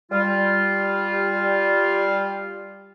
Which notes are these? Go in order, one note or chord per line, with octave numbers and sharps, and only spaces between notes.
G3 F4